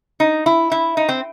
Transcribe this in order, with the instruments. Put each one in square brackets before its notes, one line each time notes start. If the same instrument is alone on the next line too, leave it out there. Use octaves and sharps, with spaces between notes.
[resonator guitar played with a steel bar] D#4
E4
E4
D#4
C4